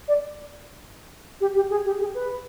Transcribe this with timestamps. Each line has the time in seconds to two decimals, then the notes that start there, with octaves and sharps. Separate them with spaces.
0.08 D5
1.41 G4
1.56 G4
1.70 G#4
1.85 G4
2.00 G#4
2.15 B4